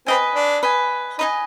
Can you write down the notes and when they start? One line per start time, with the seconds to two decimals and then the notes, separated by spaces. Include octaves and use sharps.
0.06 C4 B4 D#5 G#5
0.35 D4
0.63 B4 D#5 G#5
1.19 D#4 B4 D#5 G#5